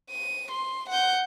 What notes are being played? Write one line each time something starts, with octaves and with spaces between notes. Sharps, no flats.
D#7
C6
F#5 G6